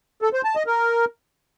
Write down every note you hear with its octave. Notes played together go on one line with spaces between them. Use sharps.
A4
C5
A5
D#5
A#4